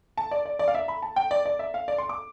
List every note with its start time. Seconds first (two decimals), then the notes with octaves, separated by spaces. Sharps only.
0.17 A5
0.31 D5
0.46 D5
0.59 D5
0.68 F5
0.75 E5
0.88 B5
1.02 A5
1.16 G5
1.31 D5
1.46 D5
1.59 E5
1.74 F5
1.88 D5
1.98 C6
2.09 D6